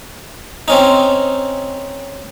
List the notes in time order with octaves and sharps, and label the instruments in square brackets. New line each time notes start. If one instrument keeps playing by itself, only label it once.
[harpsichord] C4 C#4 D#4